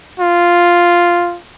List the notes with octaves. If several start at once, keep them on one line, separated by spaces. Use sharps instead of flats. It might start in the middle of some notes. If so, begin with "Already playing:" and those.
F4